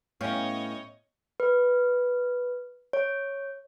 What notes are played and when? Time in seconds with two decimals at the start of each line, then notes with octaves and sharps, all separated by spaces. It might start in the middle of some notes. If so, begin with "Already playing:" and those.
0.21 A2 B3 C#4 C#5 D#5 F5 G5
1.40 B4
2.93 C#5